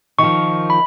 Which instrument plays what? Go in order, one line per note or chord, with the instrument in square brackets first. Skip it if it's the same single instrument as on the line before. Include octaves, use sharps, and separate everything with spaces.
[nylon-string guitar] D#3 F3 [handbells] C#6
[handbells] B5